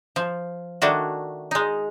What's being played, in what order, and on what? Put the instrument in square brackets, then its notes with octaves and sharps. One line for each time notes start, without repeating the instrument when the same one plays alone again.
[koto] F3
D#3 A3 D4 E4 F#4
G#3 D#4